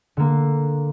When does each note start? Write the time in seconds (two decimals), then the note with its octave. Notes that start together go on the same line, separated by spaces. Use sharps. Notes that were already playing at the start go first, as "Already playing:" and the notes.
0.17 D3 A#3